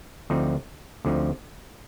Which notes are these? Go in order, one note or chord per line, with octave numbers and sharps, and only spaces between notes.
D2 D3 F3 C4 D#4
D2 D3 F3 C4 D#4